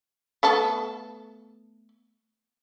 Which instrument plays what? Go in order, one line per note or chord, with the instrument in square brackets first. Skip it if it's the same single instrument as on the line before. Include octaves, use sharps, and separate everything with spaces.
[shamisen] A3 B3 A4